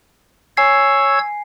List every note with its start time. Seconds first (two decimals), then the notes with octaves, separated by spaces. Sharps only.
0.57 C#5 G#5 E6 G#6 C7